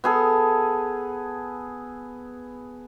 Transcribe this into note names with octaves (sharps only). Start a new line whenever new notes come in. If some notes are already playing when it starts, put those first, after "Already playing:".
B3 G#4 A4